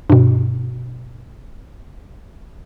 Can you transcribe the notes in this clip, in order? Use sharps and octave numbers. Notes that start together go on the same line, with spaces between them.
G2 B2